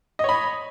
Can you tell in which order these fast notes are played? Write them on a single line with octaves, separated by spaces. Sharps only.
D#5 C#5 B5